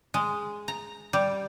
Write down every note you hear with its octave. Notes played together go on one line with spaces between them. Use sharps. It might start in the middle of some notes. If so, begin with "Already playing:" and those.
G#3
A#5
G3